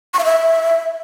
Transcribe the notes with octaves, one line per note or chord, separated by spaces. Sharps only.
C#6
F5
E5